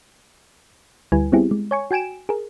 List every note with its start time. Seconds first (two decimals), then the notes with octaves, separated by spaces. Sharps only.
1.12 D2 G3 E4 B4 G#5
1.32 G3 B3 C4 E4 G4 G#4
1.51 G#3
1.71 C#5 G#5 C#6
1.91 F#4 G5 G#5 D7 E7
2.29 G#4 A#4